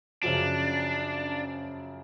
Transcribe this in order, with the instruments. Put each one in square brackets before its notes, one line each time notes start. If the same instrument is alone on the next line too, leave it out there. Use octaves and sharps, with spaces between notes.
[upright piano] F#2 C#3 F3 [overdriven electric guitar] D4